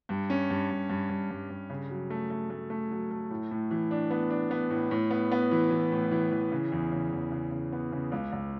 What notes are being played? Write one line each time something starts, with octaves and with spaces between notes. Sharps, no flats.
G2
C#4
G2
G2
G2
G2
G2
G2
C#3
F#3
A3
A3
A3
A3
F#3
A3
A2
A2
E3
D4
B3
D4
B3
A2
A2
B3
B3
E3
E3
A2
E3
E3
C#3
E2
C#3
E2
C#3
C#3
B3
C#3
C#2
C#2